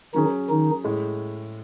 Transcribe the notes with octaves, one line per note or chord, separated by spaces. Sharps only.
D#3 F#3 C#4 D#4 G#4
D#3 D#4
A2 G#3